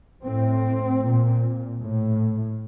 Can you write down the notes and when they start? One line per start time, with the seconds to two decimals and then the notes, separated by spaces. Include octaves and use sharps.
0.24 A2 C4
1.02 A#2
1.81 A2